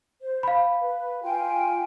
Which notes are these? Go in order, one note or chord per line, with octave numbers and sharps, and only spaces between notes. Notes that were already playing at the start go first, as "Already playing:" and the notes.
C5
F5 B5
B4
F4 G5 G#5